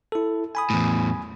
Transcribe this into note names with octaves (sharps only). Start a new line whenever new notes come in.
E4 A4
G#5 B5 D#6
E2 A2